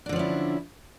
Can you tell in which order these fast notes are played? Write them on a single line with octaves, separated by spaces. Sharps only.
D4 D3 F3 C#4 E4